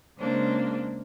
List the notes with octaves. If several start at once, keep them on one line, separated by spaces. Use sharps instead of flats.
C#3 G#3 A#3 C4 D4